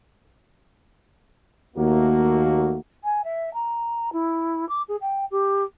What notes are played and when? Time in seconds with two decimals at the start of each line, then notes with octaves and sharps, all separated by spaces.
1.76 D#2 A3 A#3 F#4
3.04 G#5
3.24 E5
3.54 A#5
4.13 E4
4.69 D6
4.88 G#4
5.01 G5
5.31 G4